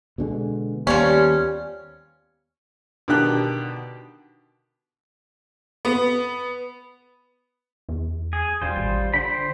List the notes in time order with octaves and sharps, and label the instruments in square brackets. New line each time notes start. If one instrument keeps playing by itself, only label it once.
[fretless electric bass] B2 D3 G#3
[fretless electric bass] D#2 B3 [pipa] F3 C#4 [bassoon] G3
[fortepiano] B2 D3 D#3 D4 G4 F#6
[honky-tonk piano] B3
[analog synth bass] E2
[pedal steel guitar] G#4
[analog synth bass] E1 [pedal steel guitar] G3 F4 C5
[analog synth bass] A1
[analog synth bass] D3 [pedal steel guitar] C5 G5 B5